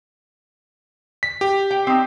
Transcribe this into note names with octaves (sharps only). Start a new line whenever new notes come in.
B6
G4
G5
C4 D#4